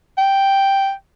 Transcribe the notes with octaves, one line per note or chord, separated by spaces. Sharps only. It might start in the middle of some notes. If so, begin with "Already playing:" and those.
G5